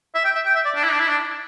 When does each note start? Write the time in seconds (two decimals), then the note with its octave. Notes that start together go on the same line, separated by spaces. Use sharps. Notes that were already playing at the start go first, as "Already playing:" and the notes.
0.15 E5
0.25 G5
0.35 E5
0.46 G5
0.55 E5
0.65 D5
0.75 D4
0.84 E4
0.92 D4
1.00 E4
1.08 D4